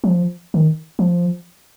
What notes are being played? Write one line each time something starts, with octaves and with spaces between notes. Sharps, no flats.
F#3
F3
D#3
F3